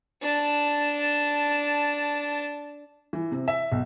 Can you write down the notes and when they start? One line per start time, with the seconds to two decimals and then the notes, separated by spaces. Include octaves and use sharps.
0.22 D4 A5
3.13 E3
3.32 C3
3.48 E5
3.72 B1